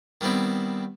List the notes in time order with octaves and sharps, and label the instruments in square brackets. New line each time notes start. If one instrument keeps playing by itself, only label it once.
[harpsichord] D#3 G3 B3 C4 E4